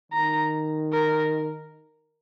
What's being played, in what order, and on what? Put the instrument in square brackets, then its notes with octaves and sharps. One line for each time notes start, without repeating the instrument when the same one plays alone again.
[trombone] D#3 [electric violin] A#5
[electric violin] A#4